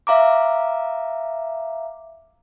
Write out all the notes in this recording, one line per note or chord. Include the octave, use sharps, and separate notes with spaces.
E5 F5 A#5 D6